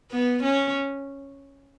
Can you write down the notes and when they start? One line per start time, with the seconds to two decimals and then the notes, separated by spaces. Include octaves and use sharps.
0.11 B3
0.43 C#4